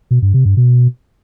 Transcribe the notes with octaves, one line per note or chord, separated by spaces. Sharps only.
B2
G2
C3
G2
B2